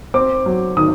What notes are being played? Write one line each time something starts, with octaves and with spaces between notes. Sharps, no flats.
C4 D6
F#3
D#3 D#6